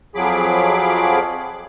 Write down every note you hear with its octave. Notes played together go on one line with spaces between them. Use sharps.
F2 F3 F#3 G#4 B5 D6